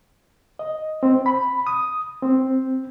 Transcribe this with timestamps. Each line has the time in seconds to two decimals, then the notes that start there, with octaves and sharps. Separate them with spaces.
0.59 D#5
1.03 C4
1.26 B5
1.67 D#6
2.22 C4